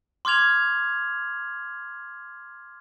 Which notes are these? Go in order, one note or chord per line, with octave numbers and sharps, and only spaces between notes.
C6 D6 F6 G#6 F7